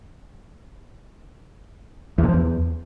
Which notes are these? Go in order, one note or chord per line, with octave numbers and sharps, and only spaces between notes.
E2
A#2
F3
E2